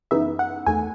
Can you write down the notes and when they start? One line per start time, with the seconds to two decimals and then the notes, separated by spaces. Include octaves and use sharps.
0.11 F#2 C#3 E3 B3 D#4 E5
0.39 F#5
0.66 E2 D#3 A3 G#5